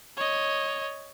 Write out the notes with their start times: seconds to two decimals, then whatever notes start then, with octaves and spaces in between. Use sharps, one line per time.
0.17 C#5 D#5